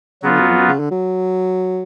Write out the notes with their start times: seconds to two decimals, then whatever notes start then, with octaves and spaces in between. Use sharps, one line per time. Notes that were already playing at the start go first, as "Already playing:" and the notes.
0.22 C#3 F#3 B3 F4
0.32 D3
0.40 F#2
0.48 F2
0.57 F#2
0.69 C#3
0.79 D3
0.91 F#3